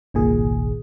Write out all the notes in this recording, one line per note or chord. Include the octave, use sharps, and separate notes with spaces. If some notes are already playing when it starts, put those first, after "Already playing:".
G1 C2 A#2 D#3 G#4